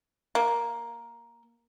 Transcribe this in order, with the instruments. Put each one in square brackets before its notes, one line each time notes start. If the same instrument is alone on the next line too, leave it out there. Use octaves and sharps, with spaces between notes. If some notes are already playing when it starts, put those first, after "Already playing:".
[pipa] A#3